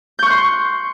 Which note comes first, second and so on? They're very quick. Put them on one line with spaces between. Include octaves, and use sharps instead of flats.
G6 C#6 F#6 C6